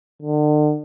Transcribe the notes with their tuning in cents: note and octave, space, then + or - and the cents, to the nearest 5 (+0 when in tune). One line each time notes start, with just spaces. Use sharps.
D3 +40